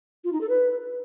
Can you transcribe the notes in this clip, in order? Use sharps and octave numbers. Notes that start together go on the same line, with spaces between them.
F4
D#4
A4
B4